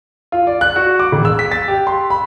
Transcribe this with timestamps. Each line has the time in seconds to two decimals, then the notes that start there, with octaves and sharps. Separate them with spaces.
0.32 F4
0.47 D5
0.61 F#6
0.76 F#4
0.99 D6
1.12 E1
1.25 E6
1.39 B6
1.52 A6
1.68 G4
1.87 C6
2.10 B5